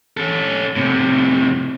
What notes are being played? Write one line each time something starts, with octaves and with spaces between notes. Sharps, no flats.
C#4 A4
A2 C3